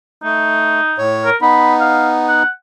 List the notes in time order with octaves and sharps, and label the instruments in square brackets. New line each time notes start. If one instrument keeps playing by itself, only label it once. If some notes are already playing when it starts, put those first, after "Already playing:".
[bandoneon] A3 [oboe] D#4
[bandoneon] A2 C#5
[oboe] A#4
[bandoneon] B3 D#4 [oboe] B5
[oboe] F5
F#5